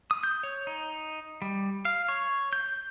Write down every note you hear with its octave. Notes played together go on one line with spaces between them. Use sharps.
D#6
G6
C#5
D#4
G3
F5
C#5
G6